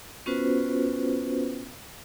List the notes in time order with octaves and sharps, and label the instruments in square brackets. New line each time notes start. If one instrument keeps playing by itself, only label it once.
[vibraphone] B3 C#4 F4 F#4 B4 C5